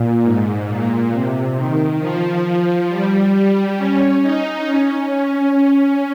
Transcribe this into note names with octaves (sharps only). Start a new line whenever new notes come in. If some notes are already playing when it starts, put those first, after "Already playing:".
Already playing: A#2
G#2
A#2
C3
D#3
F3
F3
G3
G3
C#4
D#4
C#4
C#4
C#4